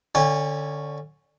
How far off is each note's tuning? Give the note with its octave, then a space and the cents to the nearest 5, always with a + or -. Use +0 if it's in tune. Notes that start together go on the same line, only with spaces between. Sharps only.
D3 +10 C#4 +0 G#5 -40